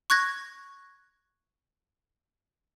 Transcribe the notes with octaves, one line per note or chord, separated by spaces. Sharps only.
C#6 F#6 G#6 A#6